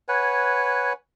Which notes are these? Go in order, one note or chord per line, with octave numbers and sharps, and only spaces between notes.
B4 C#5 F#5 G#5